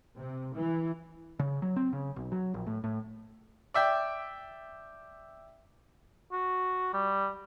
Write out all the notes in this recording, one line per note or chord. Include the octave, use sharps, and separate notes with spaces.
C3
E3
C#3
F#3
C4
C#3
B1
F#3
A#1
A2
A2
D5 E5 G5
F#4
G3